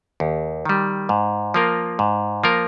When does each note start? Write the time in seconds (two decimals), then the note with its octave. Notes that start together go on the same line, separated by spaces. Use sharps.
0.20 D#2
0.65 D#3 G3
1.09 G#2
1.54 F3 A#3 F4 A#4
1.99 G#2
2.44 F3 A#3 F4 A#4